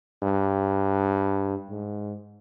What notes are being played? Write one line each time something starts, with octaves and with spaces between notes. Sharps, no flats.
G2
G#2